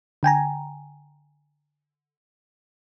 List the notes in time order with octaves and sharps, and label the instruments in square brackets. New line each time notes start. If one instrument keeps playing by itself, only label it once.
[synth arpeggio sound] D3 G5 G#5 A#5